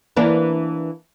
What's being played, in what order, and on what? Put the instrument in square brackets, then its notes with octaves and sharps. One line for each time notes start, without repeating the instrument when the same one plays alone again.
[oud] E3 A#3 D4